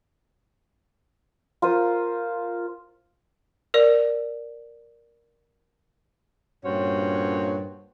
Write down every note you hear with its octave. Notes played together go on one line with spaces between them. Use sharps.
F4 A#4 C5 D#6
A#4 D5
G2 A#2 C#4 F#4 C5 C#5